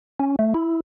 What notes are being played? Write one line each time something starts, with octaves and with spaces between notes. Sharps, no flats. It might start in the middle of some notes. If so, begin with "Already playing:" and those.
C#4
A3
E4